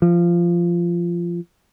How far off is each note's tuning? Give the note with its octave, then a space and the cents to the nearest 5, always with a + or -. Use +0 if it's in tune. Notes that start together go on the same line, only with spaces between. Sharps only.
F3 -15